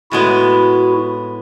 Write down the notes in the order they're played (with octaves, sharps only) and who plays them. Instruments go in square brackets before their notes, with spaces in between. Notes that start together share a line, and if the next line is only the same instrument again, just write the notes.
[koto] A2 G#3 B3 [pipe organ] E4 F#4